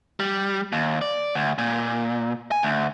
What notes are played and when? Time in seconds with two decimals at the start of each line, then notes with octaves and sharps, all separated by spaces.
0.20 G3
0.73 D#2
1.01 D5
1.35 D2
1.58 A#2
2.51 G#5
2.63 D2